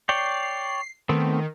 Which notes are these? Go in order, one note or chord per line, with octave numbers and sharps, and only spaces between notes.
C#5 D5 G5 C7
D#3 A3 B3 C4